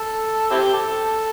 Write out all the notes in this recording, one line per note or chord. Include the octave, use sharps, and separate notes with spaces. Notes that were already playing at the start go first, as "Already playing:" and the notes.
Already playing: A4
C4 E4 G4
A4